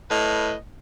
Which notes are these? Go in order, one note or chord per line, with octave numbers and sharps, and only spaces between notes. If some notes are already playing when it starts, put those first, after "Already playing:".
A2 B4 D#5